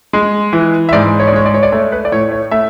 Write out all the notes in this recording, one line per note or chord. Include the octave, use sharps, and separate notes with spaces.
G#3
E3
E5
G#2 D5
C#5
D5
G#3 C#5
D5
C#5
D5
A3 C#5
B4
D5
A2 C#5
C#5
A3 E5